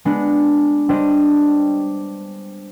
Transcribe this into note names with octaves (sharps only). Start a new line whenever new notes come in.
G#3 B3 D4
G3 D4 G4 C5 D#5